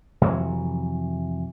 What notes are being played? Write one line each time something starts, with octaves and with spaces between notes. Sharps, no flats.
F2 C3 E3 F#3